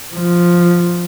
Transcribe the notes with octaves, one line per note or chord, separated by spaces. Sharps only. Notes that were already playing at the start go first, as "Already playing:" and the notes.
F3